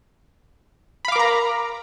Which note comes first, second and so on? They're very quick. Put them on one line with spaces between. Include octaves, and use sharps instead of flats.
B5 F5 D6 A#4 A#5